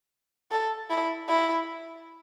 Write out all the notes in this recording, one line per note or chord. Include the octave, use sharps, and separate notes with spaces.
A4
E4
E4